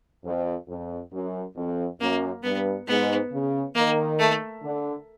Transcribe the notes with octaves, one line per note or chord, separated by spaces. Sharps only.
F2
F2
F#2
F2
F#2 A#3
G2 B3
G#2 B3
C#3
D#3 A#3
A3
D3